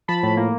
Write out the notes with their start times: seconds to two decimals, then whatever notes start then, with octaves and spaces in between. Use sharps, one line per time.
0.08 F3 A5 B5
0.23 A2
0.37 A#3